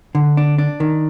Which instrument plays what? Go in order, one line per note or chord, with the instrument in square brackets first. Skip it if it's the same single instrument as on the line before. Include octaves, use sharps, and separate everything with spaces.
[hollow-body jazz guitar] D3
D4
D4
D#3